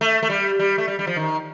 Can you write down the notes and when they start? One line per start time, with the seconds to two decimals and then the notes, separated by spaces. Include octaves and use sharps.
0.01 A3
0.23 A3
0.30 G3
0.59 G3
0.78 A3
0.88 G3
0.99 G3
1.07 F3
1.16 D#3